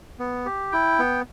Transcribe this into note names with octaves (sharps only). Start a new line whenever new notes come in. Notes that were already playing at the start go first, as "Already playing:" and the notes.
B3
G4
E4 G5
B3